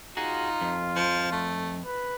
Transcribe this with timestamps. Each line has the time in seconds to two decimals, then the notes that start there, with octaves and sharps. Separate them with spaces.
0.17 D#4 F4 F#4 G#4
0.61 F2
0.96 F3
1.32 A3
1.85 B4